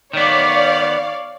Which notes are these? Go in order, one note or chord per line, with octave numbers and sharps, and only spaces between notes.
D#3 B3 C#5 D5 F5